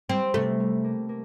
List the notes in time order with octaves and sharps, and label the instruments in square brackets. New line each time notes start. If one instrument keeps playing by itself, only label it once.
[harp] G3 [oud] C4
[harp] C3 [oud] A3
[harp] G3
A#3
A#3